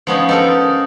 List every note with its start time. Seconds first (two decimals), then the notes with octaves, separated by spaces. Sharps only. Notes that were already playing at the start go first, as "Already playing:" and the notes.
0.07 F3 B3 C#4 D#4
0.29 D#4 A4 A#4